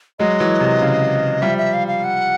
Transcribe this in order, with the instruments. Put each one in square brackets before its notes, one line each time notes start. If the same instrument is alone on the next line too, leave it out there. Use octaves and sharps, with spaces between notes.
[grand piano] F#3 G#3 [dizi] D#5
[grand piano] E3 F#3
C3
C#3
[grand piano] F3 G3 [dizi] E5
[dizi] E5
F5
F5
F#5